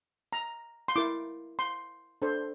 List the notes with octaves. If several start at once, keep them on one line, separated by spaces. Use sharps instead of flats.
A#5
C6
E4 A#4 D6
C6
D4 A4 C5